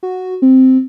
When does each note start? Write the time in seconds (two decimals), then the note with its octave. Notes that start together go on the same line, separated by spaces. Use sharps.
0.03 F#4
0.42 C4